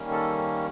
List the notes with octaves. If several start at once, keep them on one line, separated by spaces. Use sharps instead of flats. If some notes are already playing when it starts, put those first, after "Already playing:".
Already playing: D#3 G3 A#3 C#4
A4